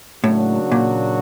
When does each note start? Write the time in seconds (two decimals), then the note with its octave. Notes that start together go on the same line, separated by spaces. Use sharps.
0.24 A2 C#3 F#3 A#3 D4 F#4
0.72 A#2